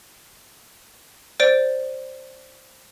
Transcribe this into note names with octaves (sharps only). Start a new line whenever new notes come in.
C5 D5 D7